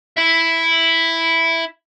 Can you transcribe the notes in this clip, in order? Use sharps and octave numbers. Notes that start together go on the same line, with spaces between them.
E4 E5